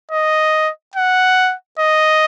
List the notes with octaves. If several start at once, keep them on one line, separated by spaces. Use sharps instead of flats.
D#5
F#5
D#5